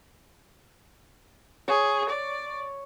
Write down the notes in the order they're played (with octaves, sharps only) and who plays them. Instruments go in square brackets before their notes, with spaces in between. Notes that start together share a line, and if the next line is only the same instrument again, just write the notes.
[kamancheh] G#4 [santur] C#5
[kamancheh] D5